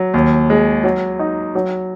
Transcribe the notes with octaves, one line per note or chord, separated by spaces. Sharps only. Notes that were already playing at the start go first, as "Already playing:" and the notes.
Already playing: F#3
D#2
G#3
F#3
D#4
F#3